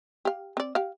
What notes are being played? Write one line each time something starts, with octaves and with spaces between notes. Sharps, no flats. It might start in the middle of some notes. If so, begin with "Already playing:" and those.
G4 F5
C4 D5
G4 F5